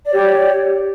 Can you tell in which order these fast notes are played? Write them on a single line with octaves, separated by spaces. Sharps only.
D5 C#5 G4